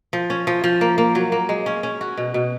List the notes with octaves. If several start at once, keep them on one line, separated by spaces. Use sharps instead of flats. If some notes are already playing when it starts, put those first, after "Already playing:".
F3
C#4
F3
F3
A#3
A#3
F#3
A#3
G#3
C#4
C#4
F#4
B2
B2